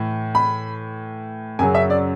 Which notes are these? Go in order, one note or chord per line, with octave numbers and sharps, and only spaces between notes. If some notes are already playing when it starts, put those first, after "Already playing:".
Already playing: A2 E3
B5
F#2 C#3 F#3 G#5
E5
D5